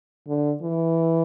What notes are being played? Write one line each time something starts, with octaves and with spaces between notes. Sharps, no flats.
D3
E3